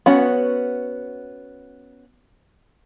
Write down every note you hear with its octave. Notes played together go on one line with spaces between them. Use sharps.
B3 C#4 F#4